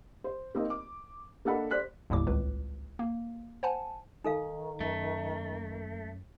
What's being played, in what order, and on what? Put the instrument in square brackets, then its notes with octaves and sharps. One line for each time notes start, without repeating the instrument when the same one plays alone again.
[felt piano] C5
A#3 C4 D#4 D#5
D6
A#3 D4 A4 D#5 F#5 B5
C5 D5 F#6 B6
[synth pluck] G1 D#2 A2 G3 D6
G#1 C#2 B4
A#3
C5 F#5 G#5 A5
[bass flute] D#3 [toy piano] D#4 A4 F5
[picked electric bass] F#2 [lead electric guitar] A3